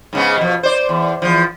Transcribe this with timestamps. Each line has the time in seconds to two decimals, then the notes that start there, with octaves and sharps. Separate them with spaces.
0.13 G#2 C#3 B3
0.38 B2 F3
0.63 C5 D5
0.89 E2
1.22 E2 G#2 F3